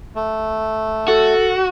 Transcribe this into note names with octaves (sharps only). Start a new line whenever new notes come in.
A3
F#4 A4